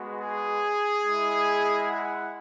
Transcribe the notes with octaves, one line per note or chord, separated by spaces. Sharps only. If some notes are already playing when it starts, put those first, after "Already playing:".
Already playing: G#3 B3 F#4
G#4
G#3 E4
F#5